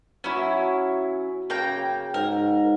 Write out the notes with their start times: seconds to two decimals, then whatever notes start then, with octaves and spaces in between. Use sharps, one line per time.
0.24 F#3 C#4 E4 C#5 A#5
1.50 C#3 A#3 G5 A#5
2.14 G#2 A#4